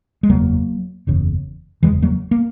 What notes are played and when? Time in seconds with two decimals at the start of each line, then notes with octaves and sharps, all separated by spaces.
0.23 G#3
0.29 F#1 E2 C#3 F#3 A#3
1.07 F#1 E2 C#3
1.83 F#1 E2 C#3 E3 G#3
2.02 F#3 A#3
2.31 A#3